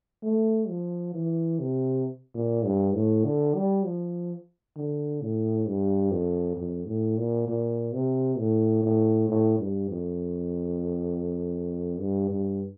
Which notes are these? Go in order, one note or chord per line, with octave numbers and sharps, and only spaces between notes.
A3
F3
E3
C3
A#2
G2
A2
D3
G3
F3
D3
A2
G2
F2
F2
A2
A#2
A#2
C3
A2
A2
A2
G2
F2
G2
G2